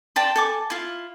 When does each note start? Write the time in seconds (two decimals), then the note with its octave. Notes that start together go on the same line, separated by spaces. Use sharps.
0.16 D5 G5 A5 C6
0.36 A4 G#5 D6
0.70 E4 F4